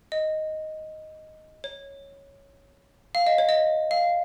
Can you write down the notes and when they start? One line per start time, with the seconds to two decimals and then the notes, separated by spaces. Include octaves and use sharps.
0.12 D#5
1.64 C#5
3.15 F5
3.27 D#5
3.38 C#5
3.49 D#5
3.91 F5